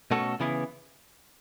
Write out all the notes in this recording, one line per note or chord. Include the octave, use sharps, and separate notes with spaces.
B2 A3 C#4 F#4 A4
C#3 E3 B3 E4